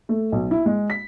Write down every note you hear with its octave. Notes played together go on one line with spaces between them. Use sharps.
A3
B1
E4
G#3
B6